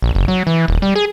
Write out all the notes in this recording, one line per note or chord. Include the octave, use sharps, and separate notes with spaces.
A#1
F#1
F#3
E3
D#1
G3
G#4